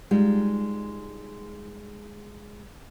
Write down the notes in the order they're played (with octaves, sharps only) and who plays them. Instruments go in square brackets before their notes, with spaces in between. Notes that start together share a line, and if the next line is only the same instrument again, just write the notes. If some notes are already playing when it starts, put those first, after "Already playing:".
[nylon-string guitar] G3 G#3 D#4 F4 G#4